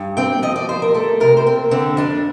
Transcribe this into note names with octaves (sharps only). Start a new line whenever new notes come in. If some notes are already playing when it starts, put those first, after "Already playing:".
Already playing: G2
C4 G5
F3 D#5
D5
F3 C5
A#4
A3 A4
C3 A#4
C5
C4 A#4
D3 C4
F2 D4